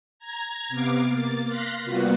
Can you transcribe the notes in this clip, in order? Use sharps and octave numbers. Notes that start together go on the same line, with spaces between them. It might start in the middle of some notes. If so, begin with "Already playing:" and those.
A#5 G#6
C3 B3 F5 D6
A#3 A6
F5 C6 F#6 A#6 B6
C3 G3 A#3 B3 F4 F#4